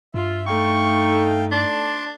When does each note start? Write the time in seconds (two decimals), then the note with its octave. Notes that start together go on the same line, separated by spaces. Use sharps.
0.14 G2 F4 E5
0.47 A3 D#4 F5 G5 C#6
1.51 D4 D5 A5 C6